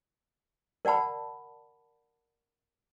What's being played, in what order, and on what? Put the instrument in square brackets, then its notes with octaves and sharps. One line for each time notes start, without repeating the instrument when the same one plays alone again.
[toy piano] A#4 D5 F#5 A5 B5